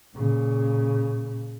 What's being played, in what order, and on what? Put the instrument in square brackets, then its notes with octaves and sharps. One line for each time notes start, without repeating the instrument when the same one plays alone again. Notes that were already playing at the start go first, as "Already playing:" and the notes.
[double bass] A#2 C#3